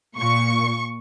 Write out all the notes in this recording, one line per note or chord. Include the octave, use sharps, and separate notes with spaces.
A#2 C#6